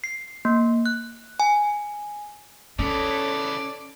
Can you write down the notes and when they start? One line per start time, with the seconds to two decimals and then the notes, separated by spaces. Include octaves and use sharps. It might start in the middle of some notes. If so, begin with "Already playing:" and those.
0.04 C7
0.45 A#3
0.86 F#6
1.40 G#5
2.79 C#3 E3 C#4 A4 C#5 D5